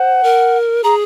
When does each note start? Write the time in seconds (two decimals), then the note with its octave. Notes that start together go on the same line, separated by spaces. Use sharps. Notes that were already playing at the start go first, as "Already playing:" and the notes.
Already playing: C5 F#5
0.23 A#4
0.84 G#4 A#5